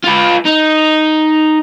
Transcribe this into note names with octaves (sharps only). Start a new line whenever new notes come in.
F4 B4
D#4